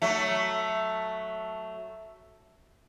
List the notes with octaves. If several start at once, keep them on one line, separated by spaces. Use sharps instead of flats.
F#3 A3